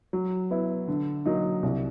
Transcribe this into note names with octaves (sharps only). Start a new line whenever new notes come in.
F#3
B3 E4
D3
F#3 A#3 D#4
C2